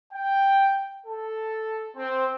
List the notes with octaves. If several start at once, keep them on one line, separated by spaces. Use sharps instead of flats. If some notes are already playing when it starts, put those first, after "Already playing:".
G5
A4
C4